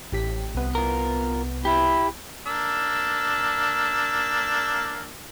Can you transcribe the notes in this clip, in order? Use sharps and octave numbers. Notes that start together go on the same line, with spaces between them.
A1 G4 B6
C2 B3
F4 A#4
E4 G4
A#3 D4 E6